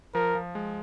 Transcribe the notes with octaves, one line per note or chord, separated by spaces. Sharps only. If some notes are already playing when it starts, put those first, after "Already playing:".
F3 A#4
F3
G#3